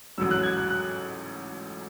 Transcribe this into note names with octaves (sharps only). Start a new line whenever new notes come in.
A1 G#2 F#3 E6
F#6
G#6
F#6
F#6